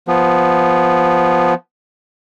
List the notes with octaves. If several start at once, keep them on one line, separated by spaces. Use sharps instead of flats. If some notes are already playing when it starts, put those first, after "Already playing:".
F3 B3